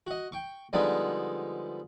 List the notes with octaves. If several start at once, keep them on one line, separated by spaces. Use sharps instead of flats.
F#4 D#5
G5 C#6
D3 F3 G3 G#3 B3 D#4